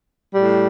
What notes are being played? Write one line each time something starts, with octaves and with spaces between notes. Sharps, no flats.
A2 G3